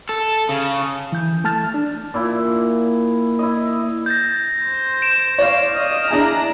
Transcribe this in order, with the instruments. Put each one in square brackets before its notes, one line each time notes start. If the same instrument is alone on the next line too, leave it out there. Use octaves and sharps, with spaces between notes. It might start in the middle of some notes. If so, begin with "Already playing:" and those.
[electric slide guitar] A4
C#3
[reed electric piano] E3 G6
A3 A5 F6 A6
D4
[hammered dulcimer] A#2 E4
E4 D#5
[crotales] G6 A6 A#6
[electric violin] C5
[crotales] D7 E7
[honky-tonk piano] C#5 D5 F5
[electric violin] D#5 F6
[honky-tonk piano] D4 E4 G#4 [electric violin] A#5